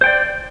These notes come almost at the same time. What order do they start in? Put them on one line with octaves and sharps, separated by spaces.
C5 G5 D5